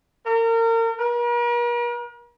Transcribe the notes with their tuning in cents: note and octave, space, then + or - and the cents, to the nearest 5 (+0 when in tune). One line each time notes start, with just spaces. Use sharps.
A#4 -30
A#4 +45